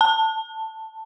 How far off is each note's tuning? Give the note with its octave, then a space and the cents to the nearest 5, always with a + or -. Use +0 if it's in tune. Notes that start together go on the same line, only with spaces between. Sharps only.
A5 +10